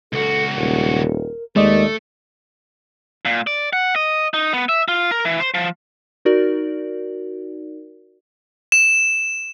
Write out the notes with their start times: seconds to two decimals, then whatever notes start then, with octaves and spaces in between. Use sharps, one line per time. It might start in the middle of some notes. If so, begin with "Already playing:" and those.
0.13 C#2 F#4 A4
0.56 D#1 A#4
1.56 D#2 G#3 A3 A#4 D5 D#5
3.25 A#2
3.47 D5
3.73 F#5
3.96 D#5
4.34 D#4
4.54 B3
4.69 E5
4.88 F4
5.11 A#4
5.25 E3
5.40 C5
5.54 F3
6.25 D#4 F#4 A#4 D5
8.72 E7